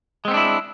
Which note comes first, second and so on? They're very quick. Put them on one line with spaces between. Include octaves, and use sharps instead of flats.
G#3 C4 B3 D4 E4